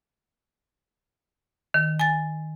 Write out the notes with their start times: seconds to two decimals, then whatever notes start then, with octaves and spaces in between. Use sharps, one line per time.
1.74 D#3
2.00 G#5 A6